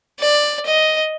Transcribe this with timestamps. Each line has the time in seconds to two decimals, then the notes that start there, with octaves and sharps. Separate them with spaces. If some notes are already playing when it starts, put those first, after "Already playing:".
0.20 D5
0.66 D#5